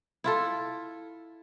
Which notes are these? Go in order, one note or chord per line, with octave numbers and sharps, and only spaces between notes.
E4 F4 A4